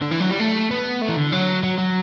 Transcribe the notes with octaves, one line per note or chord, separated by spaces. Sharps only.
D3
E3
F#3
G3
A3
B3
A3
E3
D3
F#3
F#3
F#3